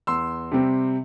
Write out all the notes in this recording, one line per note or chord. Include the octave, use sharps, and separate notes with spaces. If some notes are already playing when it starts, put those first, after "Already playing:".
E2 C6 E6
C3 G3 C4